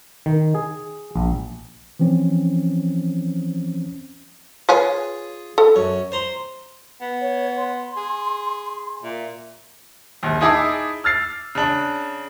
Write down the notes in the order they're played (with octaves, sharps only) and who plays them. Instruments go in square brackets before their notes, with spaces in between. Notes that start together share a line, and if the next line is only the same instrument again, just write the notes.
[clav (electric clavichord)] D#3
G#4
A#1
[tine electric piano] E3 F3 C4 C#4
[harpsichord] F4 G#4 [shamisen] B4 C#5 G#5
[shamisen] A4
[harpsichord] F#2 C#5
C5 A#5 C6
[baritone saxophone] B3
[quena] C#5
C6
[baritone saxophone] G#4
[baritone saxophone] A#2 [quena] E5
[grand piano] A#1 D#2
D#4 E4 G#4 E5 A5 D6
E6 F6 A6 C7
C#3 D4